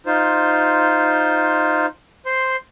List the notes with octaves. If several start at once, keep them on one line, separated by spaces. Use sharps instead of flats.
D#4 F4 C5
C5 C6